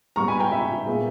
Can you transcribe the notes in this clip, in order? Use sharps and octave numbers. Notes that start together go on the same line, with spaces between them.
G#2 G3 B3 A#5 C#6
G#5 B5
G5 A#5
E5 G#5
A#2 G#3 B3